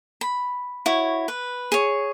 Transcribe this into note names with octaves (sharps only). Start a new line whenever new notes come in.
B5
E4 F#4 C#5
B4
G#4 C#5